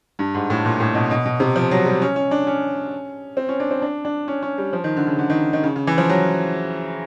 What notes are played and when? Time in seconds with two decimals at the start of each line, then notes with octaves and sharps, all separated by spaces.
0.19 G2
0.35 G#2
0.50 A2
0.65 A#2
0.80 A2
0.94 B2
1.11 B2
1.26 B2
1.40 C3
1.56 F3
1.71 F#3
1.86 G3
2.02 C#4
2.16 C#4
2.31 D4
2.47 C#4
3.37 C4
3.49 C#4
3.60 D4
3.71 C4
3.82 D4
4.05 D4
4.28 C#4
4.42 C#4
4.58 G3
4.73 F3
4.84 D#3
4.97 D3
5.07 C#3
5.19 D3
5.30 D#3
5.53 D#3
5.63 C#3
5.76 C#3
5.87 E3
5.98 F3
6.10 F#3